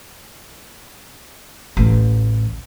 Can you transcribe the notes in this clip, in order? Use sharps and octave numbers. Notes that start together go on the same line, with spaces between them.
A1 D2